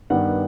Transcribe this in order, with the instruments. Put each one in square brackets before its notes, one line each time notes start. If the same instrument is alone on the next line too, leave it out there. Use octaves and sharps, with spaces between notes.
[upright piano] G2 D#3 G3 B3 F#5